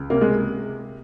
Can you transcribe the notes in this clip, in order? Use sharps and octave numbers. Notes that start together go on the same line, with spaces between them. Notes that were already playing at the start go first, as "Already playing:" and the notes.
Already playing: C#2
C3 A#3
G#3